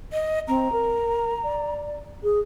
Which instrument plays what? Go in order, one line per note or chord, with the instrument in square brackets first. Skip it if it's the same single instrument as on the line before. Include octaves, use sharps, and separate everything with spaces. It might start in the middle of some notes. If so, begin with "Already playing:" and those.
[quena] D#5
[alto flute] C4 [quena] A#5
[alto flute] A#4
D5
G#4